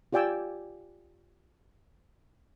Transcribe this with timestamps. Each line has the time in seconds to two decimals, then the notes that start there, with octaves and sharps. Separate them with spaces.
0.13 F4 G4 D5 G5 G#5 E6